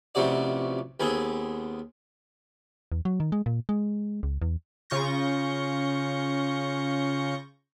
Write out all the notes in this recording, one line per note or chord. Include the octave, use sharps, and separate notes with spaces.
A1 F2 C3 F#4 D5
D#2 B3 C4 G#4 G#5
E2
F#3
D#3
G#3
A#2
G#3
C#2
E2
C#3 F4 C#6 G6 A#6